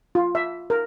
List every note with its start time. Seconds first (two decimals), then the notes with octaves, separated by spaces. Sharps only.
0.15 F4
0.35 E5
0.70 A#4